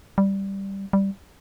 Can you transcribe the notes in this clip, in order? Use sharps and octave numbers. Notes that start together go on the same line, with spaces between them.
G3
G3